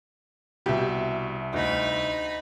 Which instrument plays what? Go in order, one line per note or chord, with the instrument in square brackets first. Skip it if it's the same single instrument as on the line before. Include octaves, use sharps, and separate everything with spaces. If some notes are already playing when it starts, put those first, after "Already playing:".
[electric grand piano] C2 E5 [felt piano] B2 G4
[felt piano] D2 [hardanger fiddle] D#4 B5